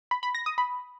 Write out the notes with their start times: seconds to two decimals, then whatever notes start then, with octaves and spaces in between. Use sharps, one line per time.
0.11 B5
0.23 B5
0.35 A#6
0.46 D#6
0.58 B5